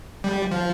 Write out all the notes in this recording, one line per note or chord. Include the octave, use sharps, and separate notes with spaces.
G3
F3